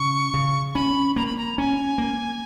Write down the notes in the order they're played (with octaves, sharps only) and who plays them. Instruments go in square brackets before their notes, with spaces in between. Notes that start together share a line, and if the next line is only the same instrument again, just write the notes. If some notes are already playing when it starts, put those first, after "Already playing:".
Already playing: [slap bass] C#3 [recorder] C#6
[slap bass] C#3
[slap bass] C#4 [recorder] B5
[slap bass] A#3 [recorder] A#5
[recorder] B5
A#5
[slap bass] C#4 [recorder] G#5
[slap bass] A#3